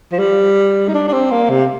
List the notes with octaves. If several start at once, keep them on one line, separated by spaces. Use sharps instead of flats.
F3
G3
D#4
D4
D4
C4
A#3
C3